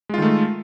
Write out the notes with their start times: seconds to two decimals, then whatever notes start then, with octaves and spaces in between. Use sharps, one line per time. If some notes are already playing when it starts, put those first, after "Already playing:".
0.09 G#3
0.14 F4
0.18 D#3
0.22 A3